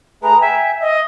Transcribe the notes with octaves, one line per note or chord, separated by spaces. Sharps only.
A3 G#4 B4 A#5
E5 G5 G#5
D#5 E5